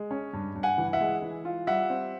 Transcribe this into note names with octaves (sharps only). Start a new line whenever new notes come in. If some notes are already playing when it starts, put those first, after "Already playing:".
Already playing: G#3
C#4
G2
G2
F#5 G#5
E3
E5 F#5
G#3
E3
F4
G3 E5 F#5
C4